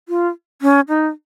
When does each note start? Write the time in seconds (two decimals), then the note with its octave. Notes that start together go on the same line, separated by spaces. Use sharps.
0.09 F4
0.62 C#4
0.89 D#4